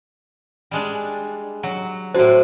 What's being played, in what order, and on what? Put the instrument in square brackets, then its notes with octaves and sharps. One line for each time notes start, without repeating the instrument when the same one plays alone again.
[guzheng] G3 G#3 D4
F#3
[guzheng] A2 D4 [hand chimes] F#4 C5